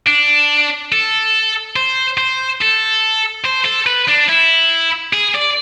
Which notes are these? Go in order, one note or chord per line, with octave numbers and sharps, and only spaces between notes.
D4
A4
C5
C5
A4
C5
A4
B4
D4
E4
G#4
D5